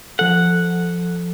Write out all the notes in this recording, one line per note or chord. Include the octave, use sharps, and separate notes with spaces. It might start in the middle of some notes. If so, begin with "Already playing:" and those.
F3 A4 F#5